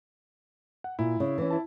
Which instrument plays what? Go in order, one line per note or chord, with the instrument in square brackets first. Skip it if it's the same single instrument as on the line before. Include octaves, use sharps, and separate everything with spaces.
[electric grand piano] F#5
[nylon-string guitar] A#2 [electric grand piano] E4
[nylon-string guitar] C#3
E3 C#4
[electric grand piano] E4 A5